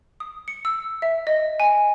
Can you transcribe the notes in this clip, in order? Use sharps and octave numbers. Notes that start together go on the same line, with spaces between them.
D#6
C#7
E6
E5
D#5
G#5